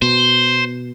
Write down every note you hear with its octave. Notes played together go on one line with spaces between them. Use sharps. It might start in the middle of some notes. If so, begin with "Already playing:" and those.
B2 C5